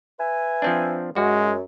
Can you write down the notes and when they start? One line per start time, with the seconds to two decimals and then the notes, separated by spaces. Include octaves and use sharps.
0.19 B4 E5 G#5
0.62 F3 C4 D4
1.16 F#2 G#3 F#4